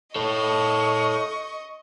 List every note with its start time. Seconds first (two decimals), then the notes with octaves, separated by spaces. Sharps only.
0.16 A4 C#5 D#5 C#6